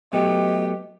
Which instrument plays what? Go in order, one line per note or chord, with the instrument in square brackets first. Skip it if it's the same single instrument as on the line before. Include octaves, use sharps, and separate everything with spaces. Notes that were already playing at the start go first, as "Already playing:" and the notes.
[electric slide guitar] F#3 A3 B3 [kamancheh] G4 [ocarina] D#5